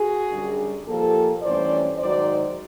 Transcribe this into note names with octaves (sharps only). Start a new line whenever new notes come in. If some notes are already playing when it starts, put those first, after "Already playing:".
Already playing: F#4 G#4
F#2 D3 G3
A#2 F3 A#3 G4 A4
G2 E3 A3 C#4 C5 D5
G#2 D#3 F#3 C5 D5